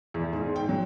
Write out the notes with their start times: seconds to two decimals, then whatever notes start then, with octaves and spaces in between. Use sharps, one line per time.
0.14 E2
0.33 G#2
0.56 G5
0.69 F#3